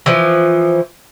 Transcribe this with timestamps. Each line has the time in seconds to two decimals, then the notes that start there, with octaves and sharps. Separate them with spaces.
0.06 E3 F3